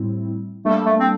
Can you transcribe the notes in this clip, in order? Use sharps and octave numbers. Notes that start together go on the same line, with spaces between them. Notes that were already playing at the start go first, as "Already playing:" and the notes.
Already playing: A2 G3 C4 E4
G3 A3 A#3 D4 A4
A3
C4